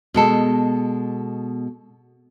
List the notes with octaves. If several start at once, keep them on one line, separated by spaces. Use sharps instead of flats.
B2 G#3 A4